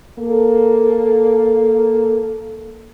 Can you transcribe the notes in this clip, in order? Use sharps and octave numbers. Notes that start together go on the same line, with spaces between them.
A#3 A4